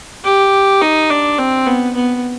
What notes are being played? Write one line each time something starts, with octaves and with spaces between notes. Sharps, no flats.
G4
D#4
D4
C4
B3
B3